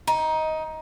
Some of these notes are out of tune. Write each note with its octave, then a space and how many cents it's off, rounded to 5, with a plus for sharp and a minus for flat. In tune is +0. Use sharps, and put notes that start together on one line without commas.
D#4 +15